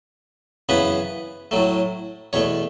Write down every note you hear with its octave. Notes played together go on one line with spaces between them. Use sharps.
F#2 C#3 E3 B3 B4
A2 F#3 A3
E2 B2 A3 C#5